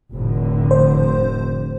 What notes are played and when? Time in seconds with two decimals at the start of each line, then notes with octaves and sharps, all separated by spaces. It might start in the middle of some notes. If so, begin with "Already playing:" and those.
0.13 F1 A2 D3
0.71 C5